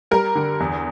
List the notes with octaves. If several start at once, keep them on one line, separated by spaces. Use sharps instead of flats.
G3 A#4
D3
E2